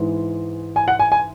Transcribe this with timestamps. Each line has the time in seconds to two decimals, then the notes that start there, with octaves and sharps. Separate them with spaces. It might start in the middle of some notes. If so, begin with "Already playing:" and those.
Already playing: G#2 E3 G#3
0.76 G#5
0.88 F#5
0.99 G#5
1.12 G#5